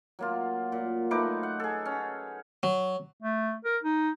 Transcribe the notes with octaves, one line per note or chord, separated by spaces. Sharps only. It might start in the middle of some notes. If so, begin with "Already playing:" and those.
F#3 A#3 F4
A#2
A3 D#4 B4 D6
F#5
G#4 A4
C#4
F#3
A3
A#4
D#4